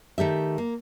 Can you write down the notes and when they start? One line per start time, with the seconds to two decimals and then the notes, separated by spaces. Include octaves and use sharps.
0.18 D#3 A3 G4 E5
0.58 A#3